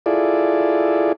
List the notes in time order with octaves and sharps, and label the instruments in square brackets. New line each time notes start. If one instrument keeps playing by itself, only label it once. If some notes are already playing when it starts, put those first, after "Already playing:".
[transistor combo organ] E4 F4 G#4 A4 D5